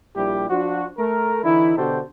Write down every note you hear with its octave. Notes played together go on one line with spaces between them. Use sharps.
A#1 G3 E4 G4
F3 D4 F4 F#4
A3 A#4
D3 E3 D#4 E4
B2 D3 F#4 G4 A4 C5